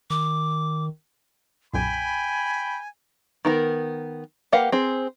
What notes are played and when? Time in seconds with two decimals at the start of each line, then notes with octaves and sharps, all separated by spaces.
0.10 D#3 D6
1.74 B1 F#2 A#2 G5 G#5 B5
3.45 D#3 B3 A#4
4.52 A#3 G4 B4 F5 F#5
4.72 C4 G#4